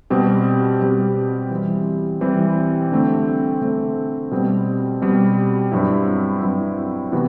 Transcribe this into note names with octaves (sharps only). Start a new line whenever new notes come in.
B2 G3 C4 G4
B2 G3 C4 G4
E3 G3 C4
E3 G3 C4
D3 A3 C4
D3 A3 C4
B2 G3 C4
B2 G3 C4
G2 F#3 C4 E4
G2 F#3 C4 E4
C3 E3 B3 F#4